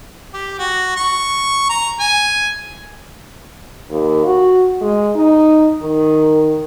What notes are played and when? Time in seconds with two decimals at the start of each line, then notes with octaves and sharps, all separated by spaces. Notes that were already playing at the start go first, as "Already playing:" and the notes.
0.34 G4
0.59 F#4
0.96 C#6
1.70 A#5
2.00 G#5
3.90 D#2
4.26 F#4
4.81 G#3
5.15 D#4
5.81 D#3